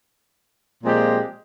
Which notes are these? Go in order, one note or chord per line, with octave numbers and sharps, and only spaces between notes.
A#2 F3 G#3 C4 G4